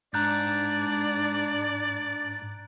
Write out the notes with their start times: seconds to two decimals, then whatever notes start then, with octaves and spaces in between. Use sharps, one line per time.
0.14 G#2 D4 D5 A#5 F#6 G6